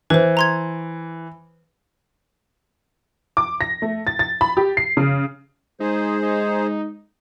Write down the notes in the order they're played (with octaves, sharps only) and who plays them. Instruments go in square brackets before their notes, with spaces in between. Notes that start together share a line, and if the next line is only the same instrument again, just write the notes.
[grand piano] E3 [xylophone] B4 C5
[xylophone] A#5 C6 G#6
[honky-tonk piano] D6
A#6
A3
A6
A6
B5
G4
C7
C#3
[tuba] G#3 [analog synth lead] D#4 [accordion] G#4 C5
[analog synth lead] D#4